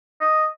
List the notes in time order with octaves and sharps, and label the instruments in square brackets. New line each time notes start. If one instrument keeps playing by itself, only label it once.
[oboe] D#5